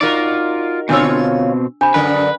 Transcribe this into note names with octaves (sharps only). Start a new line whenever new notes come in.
D#4 F4 F#4 A#4 D5
B2 D3 C4 D4 F4 C#5 E6
C3 D4 B5
F#2 D3 A#4 B4